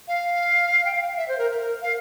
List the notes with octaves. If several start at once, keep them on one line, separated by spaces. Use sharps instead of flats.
F5
G5
F5
E5
C5
A#4
A#4
A#4
F5